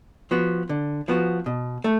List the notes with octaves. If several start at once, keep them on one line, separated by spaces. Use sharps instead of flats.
F3 B3 F#4
D3
F3 B3 F#4
B2
A3